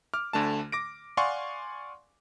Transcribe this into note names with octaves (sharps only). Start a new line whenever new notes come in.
D6 F6
D2 D3 A3 A5
D6 A#6 D7
D5 F5 F#5 G#5 C6 C#6